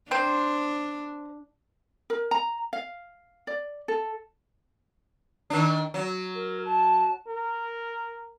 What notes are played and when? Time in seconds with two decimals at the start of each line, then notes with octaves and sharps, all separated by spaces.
0.11 C4 D4 C5
2.10 A#4
2.31 A#5
2.73 F5
3.47 D5
3.88 A4
5.50 D#3 D4
5.94 F#3
6.36 A#4
6.65 A5
7.27 A#4